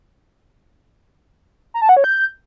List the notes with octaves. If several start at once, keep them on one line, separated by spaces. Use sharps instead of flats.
A#5
A5
F#5
C#5
G6